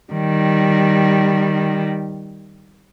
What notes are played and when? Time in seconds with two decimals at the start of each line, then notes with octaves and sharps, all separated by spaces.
0.13 D#3 G3